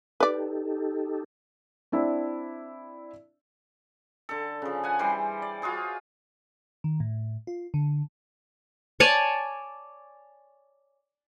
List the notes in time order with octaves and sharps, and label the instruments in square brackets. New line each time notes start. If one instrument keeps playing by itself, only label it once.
[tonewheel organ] D#4 G4 A4 [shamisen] B4 D5
[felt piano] C4 D4 E4 D5
[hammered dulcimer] D3 A4
C#3 F3
F#5 G#5
E3 G3 C5 C6
D5
F4 F#4 G#4 C5
[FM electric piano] D#3
A2
F4
D3
[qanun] C#5 D5 G#5 A5